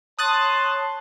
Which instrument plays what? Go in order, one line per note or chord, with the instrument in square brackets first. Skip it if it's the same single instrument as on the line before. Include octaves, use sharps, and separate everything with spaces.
[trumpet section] C#5 A5 C6 [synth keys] D#6 F#6 A6